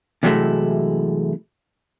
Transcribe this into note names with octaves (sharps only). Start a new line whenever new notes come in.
C3 E3 F#3 G#3 A3 E4